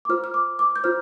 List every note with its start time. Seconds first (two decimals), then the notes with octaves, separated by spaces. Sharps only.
0.05 D6
0.09 F4 C5 F6
0.24 F6
0.34 D6
0.59 D6
0.76 G6
0.84 F4 C5 F6